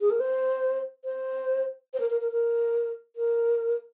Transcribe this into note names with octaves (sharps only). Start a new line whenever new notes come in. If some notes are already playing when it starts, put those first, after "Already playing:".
G#4
A#4
C5
C5
C5
A#4
A#4
A#4
A#4
A#4